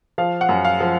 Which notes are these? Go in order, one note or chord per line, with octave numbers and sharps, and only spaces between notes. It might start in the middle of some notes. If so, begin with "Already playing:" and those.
F3 F5
F#5
F#2
F5
F3